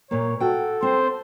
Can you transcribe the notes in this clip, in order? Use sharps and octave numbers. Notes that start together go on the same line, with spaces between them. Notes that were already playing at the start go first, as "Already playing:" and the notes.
A#2 A#3 C#5
F#4 A4 G5
C4 C5